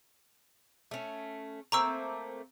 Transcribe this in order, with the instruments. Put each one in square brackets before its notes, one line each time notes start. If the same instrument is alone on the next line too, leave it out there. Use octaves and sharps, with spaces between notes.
[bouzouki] A3 C#4
[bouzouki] A3 A#3 C4 [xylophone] A#5 C#6 E6